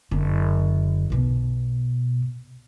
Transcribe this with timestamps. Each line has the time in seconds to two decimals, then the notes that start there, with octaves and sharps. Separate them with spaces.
0.11 F#1 D3
1.10 B1 B2